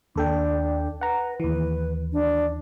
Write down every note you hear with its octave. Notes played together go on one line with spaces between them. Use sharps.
D#2 D4 A4 G5
B4 F#5 A#5
D#2 E3 B4
D4